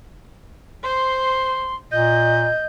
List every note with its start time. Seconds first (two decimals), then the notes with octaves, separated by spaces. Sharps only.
0.84 C5 C6
1.92 A#2 D#5 G6